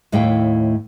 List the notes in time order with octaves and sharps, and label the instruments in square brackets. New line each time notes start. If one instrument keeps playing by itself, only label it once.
[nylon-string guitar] D#2 A2 A3 E4 F5 G5